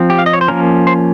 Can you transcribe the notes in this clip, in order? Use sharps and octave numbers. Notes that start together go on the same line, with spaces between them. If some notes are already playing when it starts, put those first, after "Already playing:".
Already playing: F3 C4
G4
F5
D#5
C#5
C5
F3 A#3 C#4 A#4
C5